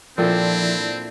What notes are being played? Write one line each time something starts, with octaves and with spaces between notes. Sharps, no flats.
A#2 F3 C4 D4 E4 A4 G5